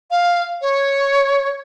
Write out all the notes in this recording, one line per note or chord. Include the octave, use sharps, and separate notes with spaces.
F5
C#5